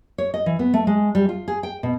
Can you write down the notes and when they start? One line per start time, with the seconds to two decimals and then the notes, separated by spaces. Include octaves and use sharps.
0.18 C#5
0.34 D#5
0.46 E3
0.59 B3
0.74 A3
0.87 G#3
1.15 G3
1.29 F4
1.48 G#4
1.63 G5
1.83 B2